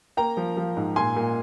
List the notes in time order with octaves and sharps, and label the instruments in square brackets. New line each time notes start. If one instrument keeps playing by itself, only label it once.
[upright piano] A#3 G5 A#5
F3
F3
G#2
A#2 G#5 C6
A#2